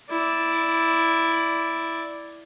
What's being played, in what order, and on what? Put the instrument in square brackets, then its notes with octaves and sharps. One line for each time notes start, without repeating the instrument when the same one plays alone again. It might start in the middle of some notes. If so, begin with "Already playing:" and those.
[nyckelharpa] E4 D5